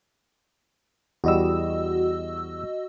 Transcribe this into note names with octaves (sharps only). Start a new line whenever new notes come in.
E2 G3 F#4 D#5 E6